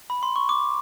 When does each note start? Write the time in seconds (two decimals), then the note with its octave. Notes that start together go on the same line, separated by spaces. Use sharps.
0.10 B5
0.23 C6
0.36 C#6
0.49 D6